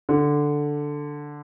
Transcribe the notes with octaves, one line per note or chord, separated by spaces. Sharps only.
D3